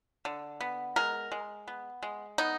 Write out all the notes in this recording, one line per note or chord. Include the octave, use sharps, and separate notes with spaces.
D3
B3
G#3 A#4
G#3
B3
G#3
B3 D#4